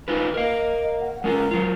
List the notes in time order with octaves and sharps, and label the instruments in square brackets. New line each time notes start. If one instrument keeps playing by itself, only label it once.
[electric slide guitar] D#4 F4 B4
[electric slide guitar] A#4 F5 [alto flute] D#5
[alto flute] F#5
[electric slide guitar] G#3 C#4 F4 [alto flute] A#4
[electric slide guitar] F#3 F4